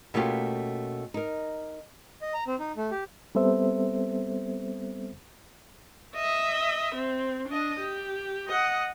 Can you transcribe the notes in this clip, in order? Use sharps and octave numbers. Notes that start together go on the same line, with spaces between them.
B2 A3 A#3 C#4 F4 G4
D#4 A#4
D#5
A#5
C4
D#4
A3
G4
G3 B3 C4 A4 C5 E5
D#5 E5
C4
D4 D#5
G4
D#5 F#5